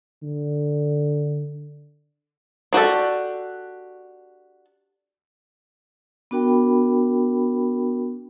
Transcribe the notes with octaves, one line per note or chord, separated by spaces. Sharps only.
D3
D4 F#4 G4 A4
B3 D4 F#4 A#4 G5 B5